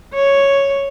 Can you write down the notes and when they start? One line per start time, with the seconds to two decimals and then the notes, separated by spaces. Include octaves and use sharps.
0.14 C#5